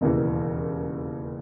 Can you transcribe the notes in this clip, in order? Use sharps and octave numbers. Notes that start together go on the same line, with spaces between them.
E1 D#2 C#3 E3